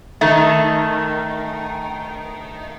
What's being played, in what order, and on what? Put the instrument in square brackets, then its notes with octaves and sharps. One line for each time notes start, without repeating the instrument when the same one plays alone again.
[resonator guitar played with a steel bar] D#3 A3